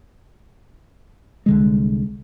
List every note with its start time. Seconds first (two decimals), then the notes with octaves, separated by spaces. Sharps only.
1.46 C2 D3 G#3